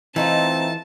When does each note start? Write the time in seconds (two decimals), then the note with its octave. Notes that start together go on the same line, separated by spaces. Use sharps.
0.16 E3 A3 C4 D#4 F4 A5